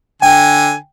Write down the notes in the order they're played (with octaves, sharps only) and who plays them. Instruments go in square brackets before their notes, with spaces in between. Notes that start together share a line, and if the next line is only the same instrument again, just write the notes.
[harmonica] D3 G#5 [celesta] G5